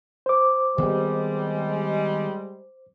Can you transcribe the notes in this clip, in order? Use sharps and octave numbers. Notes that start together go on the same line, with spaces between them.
C5 D6
D#3 G3 G#3 B3 C4